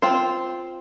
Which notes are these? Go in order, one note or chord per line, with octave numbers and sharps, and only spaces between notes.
C4 F4 C5